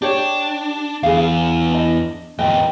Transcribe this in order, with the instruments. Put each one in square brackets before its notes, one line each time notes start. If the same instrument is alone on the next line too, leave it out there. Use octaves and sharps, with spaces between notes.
[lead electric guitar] D4 [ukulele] G4 C#5
[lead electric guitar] E2 [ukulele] G#4 F5
[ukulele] D4 D#5
[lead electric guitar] E2 G#2 [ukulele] B4 D#5 G5